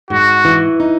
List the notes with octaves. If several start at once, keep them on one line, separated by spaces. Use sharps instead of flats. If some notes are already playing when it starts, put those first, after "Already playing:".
G#2 F#4
E3
D#4